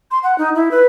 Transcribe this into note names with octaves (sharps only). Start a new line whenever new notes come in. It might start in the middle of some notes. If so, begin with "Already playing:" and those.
C6
F#5
D#4
E4
B4